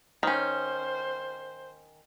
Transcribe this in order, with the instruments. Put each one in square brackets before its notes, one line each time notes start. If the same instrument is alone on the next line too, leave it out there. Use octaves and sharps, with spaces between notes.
[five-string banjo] D#3 C#4 [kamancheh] C5